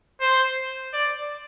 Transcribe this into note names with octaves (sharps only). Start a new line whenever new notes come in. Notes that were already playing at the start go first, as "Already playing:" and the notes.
C5
D5